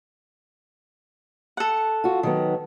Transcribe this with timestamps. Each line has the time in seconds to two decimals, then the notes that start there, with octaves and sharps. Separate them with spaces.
1.57 A4 F#5
2.04 F4 F#4
2.23 D#3 F#3 B3